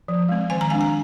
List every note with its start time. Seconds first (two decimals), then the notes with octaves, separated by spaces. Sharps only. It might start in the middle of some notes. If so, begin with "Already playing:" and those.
0.08 F3
0.29 G#3 C4
0.50 D#3 G#5
0.61 A#5
0.70 G#3 D4 G#5
0.81 A#5